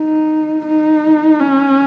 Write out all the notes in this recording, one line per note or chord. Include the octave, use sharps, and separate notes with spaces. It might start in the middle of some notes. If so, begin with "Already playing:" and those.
Already playing: D#4
D#4
C#4